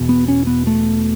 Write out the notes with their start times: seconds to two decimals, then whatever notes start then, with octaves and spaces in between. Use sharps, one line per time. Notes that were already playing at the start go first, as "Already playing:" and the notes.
Already playing: E1 E2 B2
0.09 B3
0.28 C#4
0.47 B3
0.67 A3